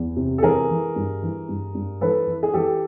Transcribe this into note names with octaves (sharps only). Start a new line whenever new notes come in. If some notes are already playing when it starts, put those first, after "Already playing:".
Already playing: E2
C3
A4
E3 G#4 A#4
E3
G2
E3
G2
G2
E3 A4 B4
E3
G#4
E3 G4 A4